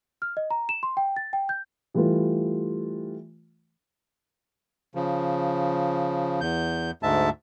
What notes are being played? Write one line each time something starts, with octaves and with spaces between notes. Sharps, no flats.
F6
D#5
A#5
E7
C6
G5
A6
G5
G6
E3 G3 A3 F4 B4
C#3 F3
E2 G6
D2 G#2 G#3 E5 A5